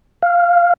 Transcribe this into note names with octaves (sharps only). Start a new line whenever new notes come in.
F5